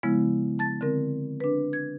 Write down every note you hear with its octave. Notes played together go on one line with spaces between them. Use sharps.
C#3 F3 G#3 B3 E4
A5 A6
D3 C4 A#4
D4 B4
G#6